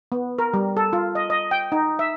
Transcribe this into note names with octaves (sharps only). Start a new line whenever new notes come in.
B3
A#4
G3
A4
F4
D#5
D#5
G5
D#4
E5